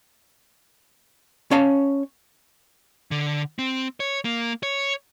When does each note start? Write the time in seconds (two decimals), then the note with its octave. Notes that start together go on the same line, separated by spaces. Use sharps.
1.51 C#4 C#5 F5 A5
3.11 D3
3.59 C4
4.00 C#5
4.25 A#3
4.63 C#5